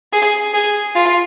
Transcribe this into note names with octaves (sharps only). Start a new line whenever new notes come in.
G#4
G#4
F4